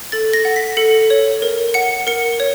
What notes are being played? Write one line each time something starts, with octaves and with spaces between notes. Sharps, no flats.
A4 A6
A#6
F#5
B6
A4 C#7
C#5
A#4
F#5 C#7
A#4 C#7
C#5